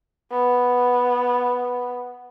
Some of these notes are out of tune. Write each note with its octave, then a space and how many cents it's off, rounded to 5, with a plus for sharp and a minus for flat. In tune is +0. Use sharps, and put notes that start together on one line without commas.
B3 -5